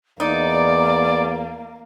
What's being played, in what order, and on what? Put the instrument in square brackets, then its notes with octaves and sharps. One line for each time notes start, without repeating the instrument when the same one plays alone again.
[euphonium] E2 [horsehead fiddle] A#3 [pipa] D#4 [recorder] D5